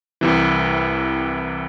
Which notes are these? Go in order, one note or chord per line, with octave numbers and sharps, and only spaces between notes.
C2 C3 E3